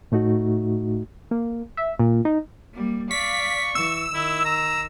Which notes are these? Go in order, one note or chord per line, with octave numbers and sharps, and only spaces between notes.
A2 A3 D#4 F#4
A#3
E5
A#2
D#4
G3 A#3
D5 F5 C#6 B6
E3 E6
D#3 E4
A#5